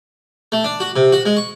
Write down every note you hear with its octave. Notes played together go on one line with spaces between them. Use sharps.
A3
D4
F#4
C3
F#4
G#3
C#6